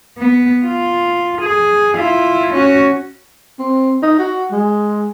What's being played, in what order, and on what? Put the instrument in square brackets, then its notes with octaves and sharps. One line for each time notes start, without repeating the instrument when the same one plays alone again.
[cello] B3
F4
G#4
E4 F4
C#4 F#4
[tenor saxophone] C4
D#4
F#4
G#3